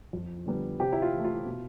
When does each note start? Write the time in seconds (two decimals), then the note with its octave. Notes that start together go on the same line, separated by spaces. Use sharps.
0.13 F2
0.46 D3 G3 B3
0.79 C3 G4
0.92 E4
1.02 F4
1.13 E3 A3
1.24 F4
1.46 B2